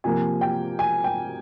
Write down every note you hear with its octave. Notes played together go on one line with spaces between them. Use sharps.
C3 F3 A#3 G#5
G5
G#5
G5